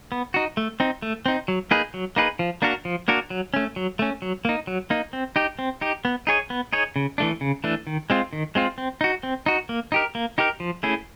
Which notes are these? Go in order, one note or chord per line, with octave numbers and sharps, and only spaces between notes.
B3
D#4 F#4
A3
C4 D#4
A3
C4 D#4
F#3
A#3 D#4 G#4 B4
F#3
A#3 D#4 G#4 B4
F3
A#3 D4 F#4 A#4
F3
A#3 D4 F#4 A#4
F#3
A3 C#4
F#3
A3 C#4
F#3
A#3 D#4
F#3
A#3 D#4
C4
D#4 G4
C4
D#4 G4
B3
D#4 G#4 C#5
B3
D#4 G#4 C#5
C#3
E3 A3 D4
C#3
E3 A3 D4
D#3
G#3 C4 F4
D#3
G#3 C4 F4
C4
D#4 F#4
C4
D#4 F#4
A#3
D#4 G4 A#4
A#3
D#4 G4 A#4
F3
A3 C#4 E4 G#4